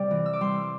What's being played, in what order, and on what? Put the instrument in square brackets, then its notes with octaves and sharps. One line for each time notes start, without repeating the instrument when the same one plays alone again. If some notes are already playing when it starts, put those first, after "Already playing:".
Already playing: [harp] C3 G3 D5
E3
E6
D6
G3 C6